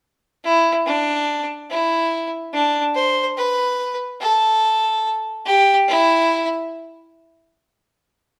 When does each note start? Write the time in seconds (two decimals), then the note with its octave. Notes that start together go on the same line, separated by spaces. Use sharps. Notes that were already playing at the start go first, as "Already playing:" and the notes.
0.44 E4
0.86 D4
1.70 E4
2.53 D4
2.95 C5
3.37 B4
4.20 A4
5.46 G4
5.88 E4